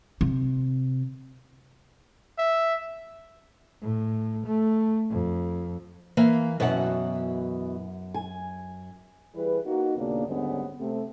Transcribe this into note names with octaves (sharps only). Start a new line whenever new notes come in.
C3
E5
A2
A3
F2
E3 A#3 F5
F#2 B2 E3 F#5
G#5
E3 G3 G#4 B4
A#3 D#4 F#4
D#2 A#2 C#3 A#3 B3 D4
D#2 G#2 D3 G3 B3 C#4
C3 A3